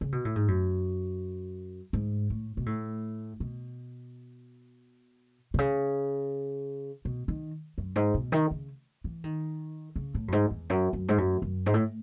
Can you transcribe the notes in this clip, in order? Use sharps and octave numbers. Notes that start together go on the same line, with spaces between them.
C#3
B2
A2
G#2
F#2
G#2
A2
B2
A2
B2
B2
C#3
B2
D#3
F#2
G#2
B2
D#3
C#3
E3
D#3
C#3
A2
F#2
G#2
E2
F#2
F#2
G#2
F#2
F#2
G#2
A2